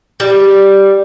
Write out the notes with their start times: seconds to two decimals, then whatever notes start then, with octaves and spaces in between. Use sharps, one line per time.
0.20 G3